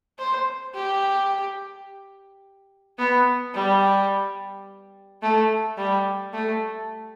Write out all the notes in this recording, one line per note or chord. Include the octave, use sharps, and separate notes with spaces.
C5
G4
B3
G3
A3
G3
A3